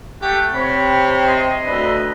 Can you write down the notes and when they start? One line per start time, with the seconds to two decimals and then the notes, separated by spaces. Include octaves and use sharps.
0.22 A3 G4 F#5
0.55 C3 C4 C#5 B5
1.28 D#5 C6
1.66 D2 D4 B4